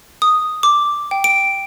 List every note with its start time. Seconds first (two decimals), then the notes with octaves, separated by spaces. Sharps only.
0.22 D#6
0.63 D6
1.11 G5
1.24 D7